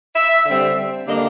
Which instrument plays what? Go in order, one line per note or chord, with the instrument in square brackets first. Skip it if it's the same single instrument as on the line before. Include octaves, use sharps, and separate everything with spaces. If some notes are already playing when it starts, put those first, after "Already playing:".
[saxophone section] E5
D3 G3 C4
D3 G3 A#3 D4 D#5